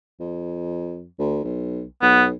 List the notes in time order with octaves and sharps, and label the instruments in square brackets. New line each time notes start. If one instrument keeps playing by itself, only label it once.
[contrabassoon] F2
D2
B1
[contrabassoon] B1 [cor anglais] B3